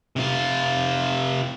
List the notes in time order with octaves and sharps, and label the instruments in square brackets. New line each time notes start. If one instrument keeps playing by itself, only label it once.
[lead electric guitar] C3 F4